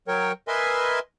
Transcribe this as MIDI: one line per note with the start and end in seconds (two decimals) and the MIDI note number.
0.08 0.32 54
0.08 0.32 70
0.08 0.32 73
0.08 0.32 79
0.48 0.99 70
0.48 0.99 71
0.48 0.99 75
0.48 0.99 76
0.48 0.99 80
0.48 0.99 84